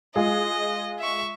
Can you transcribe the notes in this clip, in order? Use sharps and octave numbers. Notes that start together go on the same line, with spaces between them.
G#3 F4 G#4 D#5
E5 C#6